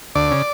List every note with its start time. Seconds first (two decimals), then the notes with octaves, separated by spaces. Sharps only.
0.15 D2 D5
0.31 C#3